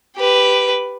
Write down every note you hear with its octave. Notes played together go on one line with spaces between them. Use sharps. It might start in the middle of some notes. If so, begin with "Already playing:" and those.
G4 B4